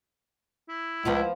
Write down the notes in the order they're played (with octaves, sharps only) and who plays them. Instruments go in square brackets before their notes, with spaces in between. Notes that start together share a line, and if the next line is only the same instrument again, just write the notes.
[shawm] E4
[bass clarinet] C#2 [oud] F3 B3 F4